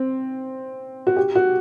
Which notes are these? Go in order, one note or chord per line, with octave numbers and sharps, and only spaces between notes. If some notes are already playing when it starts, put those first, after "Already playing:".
Already playing: C4
F#4
G4
F#4